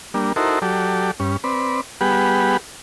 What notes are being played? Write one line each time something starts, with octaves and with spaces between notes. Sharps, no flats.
G3 A#3 D4
D#4 E4 F#4 A4 A#4 C5
F#3 G4 A4 D5
G2 C#4
C4 B4 D5
G3 B3 G4 G#4 B4 F#5